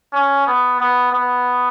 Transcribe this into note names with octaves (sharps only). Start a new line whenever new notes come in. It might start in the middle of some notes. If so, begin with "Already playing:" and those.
C#4
B3
B3
B3